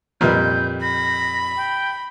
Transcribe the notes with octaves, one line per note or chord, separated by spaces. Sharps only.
F2 A#2 G3 B4 D#5 G6
B5 A#6
G5